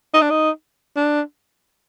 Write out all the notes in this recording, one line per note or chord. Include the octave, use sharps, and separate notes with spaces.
D#4
D4
D#4
D4